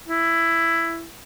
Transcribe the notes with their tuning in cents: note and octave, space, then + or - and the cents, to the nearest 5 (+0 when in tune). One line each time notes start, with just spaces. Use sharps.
E4 +10